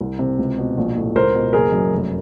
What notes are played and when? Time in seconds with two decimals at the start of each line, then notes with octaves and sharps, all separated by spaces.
0.01 C2
0.19 C3
0.39 C#2
0.58 B2
0.78 A#1
0.96 A2
1.15 C#2 A#4 C5
1.34 B2
1.53 F#1 G#4 A#4
1.72 F#2
1.92 F1